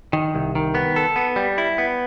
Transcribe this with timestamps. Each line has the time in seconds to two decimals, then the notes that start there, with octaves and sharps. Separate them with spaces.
0.13 D#3
0.35 C2
0.55 D#3
0.75 B3
0.96 A4
1.16 B3
1.36 G3
1.58 E4
1.78 B3